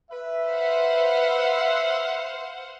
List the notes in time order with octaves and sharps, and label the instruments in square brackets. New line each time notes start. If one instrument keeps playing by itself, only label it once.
[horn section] B4 E5
[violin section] C5 F5 F#5